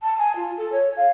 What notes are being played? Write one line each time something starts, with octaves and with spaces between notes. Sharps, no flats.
A5
G#5
F4
A4
C#5
F5